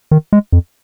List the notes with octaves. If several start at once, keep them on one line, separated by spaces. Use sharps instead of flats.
D#3
G#3
F2